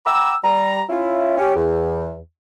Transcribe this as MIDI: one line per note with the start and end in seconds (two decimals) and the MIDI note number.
0.06 0.34 78
0.06 0.34 79
0.06 0.34 82
0.06 0.34 83
0.06 0.34 86
0.06 0.34 88
0.44 0.81 55
0.44 0.81 82
0.89 1.36 61
0.89 1.36 64
0.89 1.36 65
1.37 1.55 61
1.37 1.55 67
1.55 2.15 40